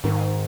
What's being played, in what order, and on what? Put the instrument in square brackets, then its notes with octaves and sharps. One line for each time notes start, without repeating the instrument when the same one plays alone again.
[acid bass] G#2 [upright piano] D#3